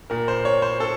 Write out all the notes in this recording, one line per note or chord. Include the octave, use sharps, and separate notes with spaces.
A#2 A#4
C5
C#5
C5
A4